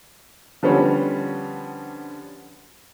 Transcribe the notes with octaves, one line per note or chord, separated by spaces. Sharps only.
D3 F3 G3 B3 C#4